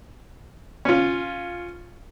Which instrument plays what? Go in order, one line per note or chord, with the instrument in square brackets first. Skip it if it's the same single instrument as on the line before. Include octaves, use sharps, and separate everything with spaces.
[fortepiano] C#4 F4